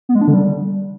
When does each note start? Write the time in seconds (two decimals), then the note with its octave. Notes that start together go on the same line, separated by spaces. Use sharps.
0.09 B3
0.15 G#3
0.21 D4
0.28 D3
0.34 G3